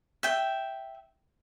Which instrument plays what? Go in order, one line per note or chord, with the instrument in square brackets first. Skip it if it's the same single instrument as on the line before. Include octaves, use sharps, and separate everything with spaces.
[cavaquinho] E5 G5